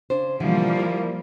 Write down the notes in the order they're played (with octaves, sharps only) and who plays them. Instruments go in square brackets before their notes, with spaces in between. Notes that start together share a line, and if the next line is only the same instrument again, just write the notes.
[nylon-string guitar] C#3 D4 C5
[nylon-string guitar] B2 D3 E3 [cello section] F3 G3 A#3
[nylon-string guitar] E4 A#4